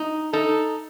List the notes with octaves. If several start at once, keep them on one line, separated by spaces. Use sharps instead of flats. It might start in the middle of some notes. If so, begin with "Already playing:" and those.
Already playing: D#4
D#4 A4